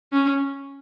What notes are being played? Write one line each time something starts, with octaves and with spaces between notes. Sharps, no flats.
C#4